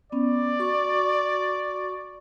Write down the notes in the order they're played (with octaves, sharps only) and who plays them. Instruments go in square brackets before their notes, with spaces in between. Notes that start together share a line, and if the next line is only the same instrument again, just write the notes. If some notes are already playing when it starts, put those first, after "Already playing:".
[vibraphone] B3 C#4 [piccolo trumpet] D5
[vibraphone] F#4 C#6